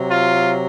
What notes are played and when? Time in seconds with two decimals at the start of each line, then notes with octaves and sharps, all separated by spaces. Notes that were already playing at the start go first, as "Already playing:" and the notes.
Already playing: C3 F#3
0.11 F4